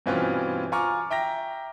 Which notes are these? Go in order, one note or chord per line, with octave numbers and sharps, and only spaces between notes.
G2 B2 E3 C4 C#4 F4
F4 G#5 A#5 C#6 D6 F6
E5 G5 A#5 A#6